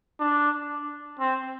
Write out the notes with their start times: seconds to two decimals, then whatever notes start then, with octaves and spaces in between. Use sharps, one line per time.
0.20 D4
1.20 C4